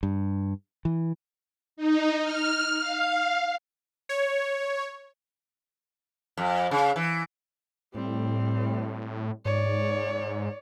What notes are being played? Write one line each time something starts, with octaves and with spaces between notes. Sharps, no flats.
G2
E3
D#4
F6
F5
C#5
F2
C#3
E3
A2 G3 C4
G#2 C#5 D5